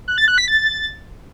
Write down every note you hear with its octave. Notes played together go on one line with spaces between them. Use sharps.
F#6
A6
F#6
B6
A6